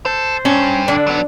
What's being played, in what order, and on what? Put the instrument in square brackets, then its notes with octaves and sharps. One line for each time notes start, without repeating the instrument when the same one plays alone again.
[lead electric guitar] A4 [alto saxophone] C5
[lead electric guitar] G2 [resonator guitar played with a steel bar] C#4
[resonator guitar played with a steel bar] D3 [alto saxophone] D4
[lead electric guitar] F#3 B3